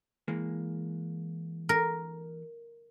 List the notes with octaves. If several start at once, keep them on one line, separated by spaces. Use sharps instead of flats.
E3 G#3 A#3
A#4